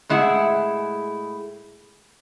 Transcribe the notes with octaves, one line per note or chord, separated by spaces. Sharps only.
A2 G#3 E4 G#4 F#5